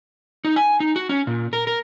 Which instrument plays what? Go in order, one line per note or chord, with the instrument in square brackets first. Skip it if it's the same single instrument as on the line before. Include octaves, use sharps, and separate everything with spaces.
[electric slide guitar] D#4
G#5
D#4
F#4
C#4
A#2
A#4
A#4